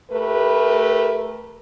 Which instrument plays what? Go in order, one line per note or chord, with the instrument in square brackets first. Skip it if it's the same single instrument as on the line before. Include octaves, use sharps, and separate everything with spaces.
[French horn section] A3 G4 A#4 B4